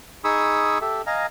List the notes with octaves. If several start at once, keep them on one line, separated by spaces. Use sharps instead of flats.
D#4 G#4 B5 C#6 D#6 E6
G4 A4 E5
D#5 F5 G#5 A#5